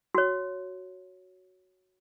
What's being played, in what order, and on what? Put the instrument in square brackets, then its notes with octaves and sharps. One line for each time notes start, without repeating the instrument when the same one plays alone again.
[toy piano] F#4 C#5